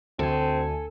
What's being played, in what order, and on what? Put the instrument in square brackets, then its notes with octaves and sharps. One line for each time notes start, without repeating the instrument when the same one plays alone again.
[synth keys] D2 G#5 [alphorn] C4 [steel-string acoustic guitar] A4